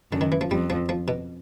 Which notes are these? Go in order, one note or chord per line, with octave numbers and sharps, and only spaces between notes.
F#2 D3
D#3
E3
F3
F2 G3
F3
F3
B2